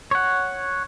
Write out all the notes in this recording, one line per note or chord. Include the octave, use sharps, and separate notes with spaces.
C#5 F#5